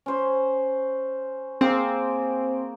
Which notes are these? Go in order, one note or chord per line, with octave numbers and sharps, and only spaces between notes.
C#4 C5
A#3 C4 G#4 G5